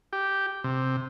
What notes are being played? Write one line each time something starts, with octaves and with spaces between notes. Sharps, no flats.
G4
C3